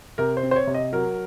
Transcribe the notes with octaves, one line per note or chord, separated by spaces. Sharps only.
C3 A#4
C5
C4
C5
C#5
C3
D#5
F#3 A#4